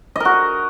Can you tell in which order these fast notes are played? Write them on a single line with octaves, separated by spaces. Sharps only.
D#5 A#4 F#4